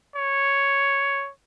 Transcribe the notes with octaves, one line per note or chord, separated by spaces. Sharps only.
C#5